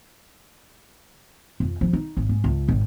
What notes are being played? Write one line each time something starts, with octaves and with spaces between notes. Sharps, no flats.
F2
F3
D#4
G#1
G#2
C#2
G#1